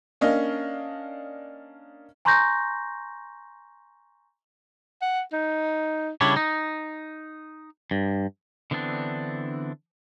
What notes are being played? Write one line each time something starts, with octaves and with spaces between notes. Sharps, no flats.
A#3 C#4 D4 D#5 F5
G#5 A#5 C6 C#6 G6 A#6
F#5
D#4
C#3 G3 D4 E4 C#5
D#4
G2
D3 E3 B3 C4 D4